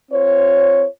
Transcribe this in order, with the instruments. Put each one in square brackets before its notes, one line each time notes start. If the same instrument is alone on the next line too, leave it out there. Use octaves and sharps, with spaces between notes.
[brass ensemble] C4 F4 C5 C#5